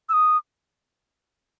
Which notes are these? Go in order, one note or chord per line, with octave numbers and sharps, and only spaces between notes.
E6
D#6